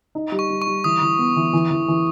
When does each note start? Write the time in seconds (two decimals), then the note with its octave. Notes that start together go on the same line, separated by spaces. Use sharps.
0.15 D#4
0.32 G3
0.39 C#6
0.50 G3
0.62 C#6
0.67 G3
0.84 E3 D#6
1.01 E3
1.18 B3
1.36 E3
1.53 E3
1.71 E3
1.88 E3